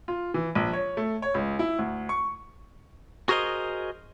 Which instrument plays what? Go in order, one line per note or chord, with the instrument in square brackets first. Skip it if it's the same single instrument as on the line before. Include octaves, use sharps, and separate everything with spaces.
[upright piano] F4
E3
A#1
C#5
A3
C#5
C#2
E4
D2
C#6
[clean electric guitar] F#4 G#4 A#4 C5 D#5